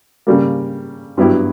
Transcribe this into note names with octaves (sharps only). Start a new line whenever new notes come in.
C#3 G3 A#3
G2 F#3 B3 E4 G4